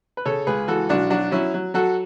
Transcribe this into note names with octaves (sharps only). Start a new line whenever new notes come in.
B4
C#3 A4 C#5
C#2 G#4 B4
E3 F#4 A4
B1 D4 F#4
F#3 D4 F#4
F#3 C#4 E4
F#3
F#3 F#4 A4